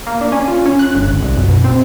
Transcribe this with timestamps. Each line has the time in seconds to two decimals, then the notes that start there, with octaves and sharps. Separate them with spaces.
0.07 A#3
0.21 D4
0.32 C#4
0.48 F4
0.66 C#4
0.79 F#6
0.95 G1
1.08 G#1
1.22 C2
1.37 F#2
1.48 B2
1.64 C4